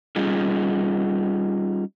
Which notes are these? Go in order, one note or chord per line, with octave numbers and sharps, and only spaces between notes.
G3 C#4 D#4 F4 G#4